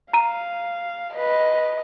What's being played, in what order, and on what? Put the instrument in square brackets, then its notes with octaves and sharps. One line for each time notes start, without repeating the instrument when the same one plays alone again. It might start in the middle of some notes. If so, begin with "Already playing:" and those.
[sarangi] F5 [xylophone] A#5 D#7
[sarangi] B4 [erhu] D#5